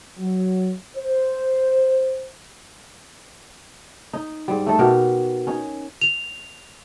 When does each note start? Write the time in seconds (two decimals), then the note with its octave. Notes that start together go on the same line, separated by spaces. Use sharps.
0.17 F#3
0.94 C5
4.13 D#4
4.48 G#2 G3
4.66 A3 D#4 A4
4.79 B2 G4 A#4
5.47 C#4 D#4
6.01 F7